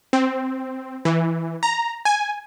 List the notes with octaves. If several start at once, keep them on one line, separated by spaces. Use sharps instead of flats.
C4
E3
A#5
G#5